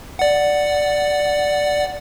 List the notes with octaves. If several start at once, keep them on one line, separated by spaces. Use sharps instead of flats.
D5 F#5